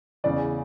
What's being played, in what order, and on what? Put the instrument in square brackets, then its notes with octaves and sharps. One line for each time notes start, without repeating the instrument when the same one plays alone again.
[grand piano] E2 C#3 E3 D5